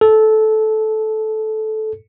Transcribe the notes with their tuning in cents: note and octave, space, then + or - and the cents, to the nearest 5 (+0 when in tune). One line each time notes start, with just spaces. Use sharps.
A4 -15